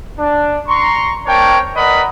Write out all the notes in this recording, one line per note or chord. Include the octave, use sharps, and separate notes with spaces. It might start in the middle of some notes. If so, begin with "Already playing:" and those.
D4
A#5 C6 C#6
C4 D4 A#4 C#5 G5 A5
A#4 B4 D5 D#5 F#5 B5